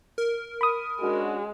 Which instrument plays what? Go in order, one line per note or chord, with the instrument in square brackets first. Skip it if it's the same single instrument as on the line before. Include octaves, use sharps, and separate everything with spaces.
[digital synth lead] A#4
[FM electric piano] B5 D#6
[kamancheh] G#3 [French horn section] C#4 D4 F#4